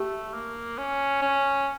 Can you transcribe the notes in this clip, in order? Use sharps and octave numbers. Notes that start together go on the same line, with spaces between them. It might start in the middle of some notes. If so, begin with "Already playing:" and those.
Already playing: A3 G4
A#3
C#4
C#4